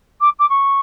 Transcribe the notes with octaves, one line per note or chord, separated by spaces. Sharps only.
D6
D6
C#6